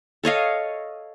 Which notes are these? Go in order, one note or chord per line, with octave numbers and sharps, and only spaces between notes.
A4 C#5 D#5 F5